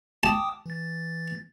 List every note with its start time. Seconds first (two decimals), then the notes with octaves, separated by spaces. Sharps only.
0.23 G5 A5 D6 D#6
0.66 E3 A6